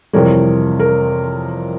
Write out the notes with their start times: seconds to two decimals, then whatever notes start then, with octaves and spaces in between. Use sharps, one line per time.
0.13 F2 C3 E3 G3 A#4 C#5
0.80 A#4